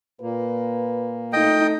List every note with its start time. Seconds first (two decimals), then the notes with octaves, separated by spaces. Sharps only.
0.21 A#2 A#3 B4
1.33 A3 D#4 D#5 G5